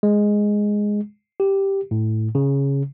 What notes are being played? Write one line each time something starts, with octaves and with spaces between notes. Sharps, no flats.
G#3
G4
A2
C#3